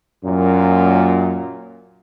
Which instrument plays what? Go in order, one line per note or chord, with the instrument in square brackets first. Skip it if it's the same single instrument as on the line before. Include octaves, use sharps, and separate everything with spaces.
[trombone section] F#2 A#2